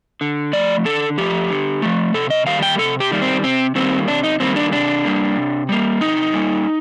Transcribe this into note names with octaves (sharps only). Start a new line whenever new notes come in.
D3
F3 A3 D5
D3 A4
F3 A3 G4
D3
F3 A3
C3 A4
D#5
D#3 G3 A#3 F5
G5
C3 A4
G4
D#3 G3 A#3
C4
C3 C4
D#3 G3 A#3 C4
C3 D4
D#4
D#3 G3 A#3 C4
D4
C3 D4
G3 A#3
C3
G3 A#3
C3 D#4
G3 A#3